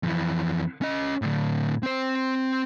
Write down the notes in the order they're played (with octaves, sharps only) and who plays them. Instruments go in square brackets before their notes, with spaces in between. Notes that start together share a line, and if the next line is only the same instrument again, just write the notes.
[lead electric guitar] F2 E3
C#4 D#5
A2 D3
C4 C5